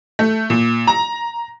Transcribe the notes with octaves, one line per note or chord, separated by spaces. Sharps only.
A3
A#2
A#5